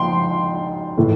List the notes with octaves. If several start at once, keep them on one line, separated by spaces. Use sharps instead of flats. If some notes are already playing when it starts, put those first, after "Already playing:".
Already playing: G#2 F3 G5 C6
A2 E3 A3